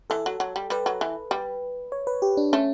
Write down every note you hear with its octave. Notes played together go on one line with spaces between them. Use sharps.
E3 A4
F#3
F#3
G3
G3 B4
F#3
E3
G3
C#5
B4
G4
D4
A3 C#4